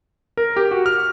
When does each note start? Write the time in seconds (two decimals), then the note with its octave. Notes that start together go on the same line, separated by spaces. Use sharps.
0.37 A#4
0.56 G4
0.71 F#4
0.86 F6